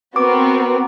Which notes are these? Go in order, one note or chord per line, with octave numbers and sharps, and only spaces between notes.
B3 C4 F#4 A#4 D6